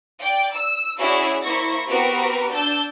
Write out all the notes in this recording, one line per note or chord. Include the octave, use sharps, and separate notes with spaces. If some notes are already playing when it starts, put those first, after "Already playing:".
D5 G5
E6
C#4 E4 F#4 G#4 C#5 D5
A#3 E4 C5 C#6 A#6
B3 C4 F#4 G4 A#4 B4
D4 A5 E6 G6